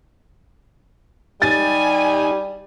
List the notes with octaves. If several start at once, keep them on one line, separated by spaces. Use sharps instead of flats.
G3 D#4 G4 G#5 A6